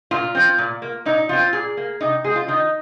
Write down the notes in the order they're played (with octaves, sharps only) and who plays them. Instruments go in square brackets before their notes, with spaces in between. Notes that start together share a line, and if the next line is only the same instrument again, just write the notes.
[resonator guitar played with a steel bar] A#2 F4
F3 C4
A#2
A#3
A#2 D#4
F3 C4 F4
A#2 G#4
A#3
C3 D#4
G#3 C4 G#4
F4
D#3 D#4